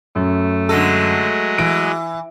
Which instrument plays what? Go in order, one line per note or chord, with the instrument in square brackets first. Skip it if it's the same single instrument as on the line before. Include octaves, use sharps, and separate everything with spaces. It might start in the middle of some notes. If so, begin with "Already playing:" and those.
[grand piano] F#2 [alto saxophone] A3
[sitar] D3 A4 [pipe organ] F#3 G#3 D#5
[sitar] E3 [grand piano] D7